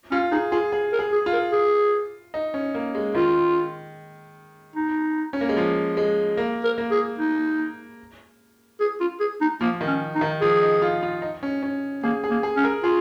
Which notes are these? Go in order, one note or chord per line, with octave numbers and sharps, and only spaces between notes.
C#4 F4
D#4 G#4
F4 G#4
G#4
A#4
G#4
G#4
F4
A#4
G#4
D#4
C#4
A#3
G#3
D#3 F4
D#4
C#4
A#3
G#3
F3
G#3
A#3
A#4
A#3
G#4
D#4
G#4
F4
G#4
D#4
F3 A#3
D#3
C#4
D#4
D#3
F3 G#4
D#4
F4
F4
D#4
C#4
C#4
A#3 G#4
G#4
A#3
G#4
C#4
A#4
F4 G#4